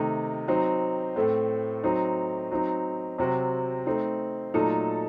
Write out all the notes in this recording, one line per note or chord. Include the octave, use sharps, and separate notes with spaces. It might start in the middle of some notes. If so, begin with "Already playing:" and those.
Already playing: C3 D#3 A3 D#4
F#3 C4 D#4
A2 A3 C4
F#3 C4 D#4
F#3 C4 D#4
C3 F#3 C4 F#4
A3 C4 D#4
A#2 F#3 A3 D#4 A4